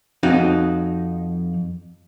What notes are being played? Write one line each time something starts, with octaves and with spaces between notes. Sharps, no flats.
F2 D#4 F#4 F5